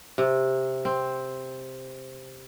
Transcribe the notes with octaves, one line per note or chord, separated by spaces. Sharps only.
C3
C4